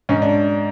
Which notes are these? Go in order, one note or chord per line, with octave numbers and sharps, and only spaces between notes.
G#2 C#4
D4